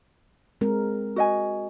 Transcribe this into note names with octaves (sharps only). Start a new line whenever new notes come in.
G#3 C4 A#4
F#4 D#5 G#5